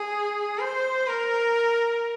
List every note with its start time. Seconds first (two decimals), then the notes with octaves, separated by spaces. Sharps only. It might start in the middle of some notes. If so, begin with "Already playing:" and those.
Already playing: G#4
0.58 C5
1.08 A#4